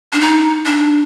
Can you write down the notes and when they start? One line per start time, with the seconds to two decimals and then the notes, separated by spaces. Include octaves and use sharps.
0.13 D4
0.21 D#4
0.65 D4